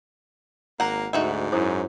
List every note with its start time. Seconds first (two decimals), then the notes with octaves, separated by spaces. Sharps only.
0.80 G#1 A#3 F#5 A#5
1.13 D2 G#2 D#4 F#4 E5
1.52 F#2 E4 C5 D#6